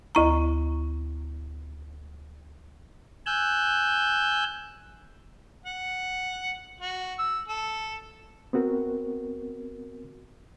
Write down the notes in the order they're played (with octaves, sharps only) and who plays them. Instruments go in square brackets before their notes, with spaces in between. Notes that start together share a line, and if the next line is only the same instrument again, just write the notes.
[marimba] D2 E4 A#5
[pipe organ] G#5 E6 F#6 G6
[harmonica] F#5
F#4
E6
A4
[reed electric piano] B3 C4 F#4 A#4